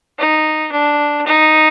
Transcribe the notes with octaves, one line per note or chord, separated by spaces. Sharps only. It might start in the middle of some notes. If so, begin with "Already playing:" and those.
D#4
D4
D#4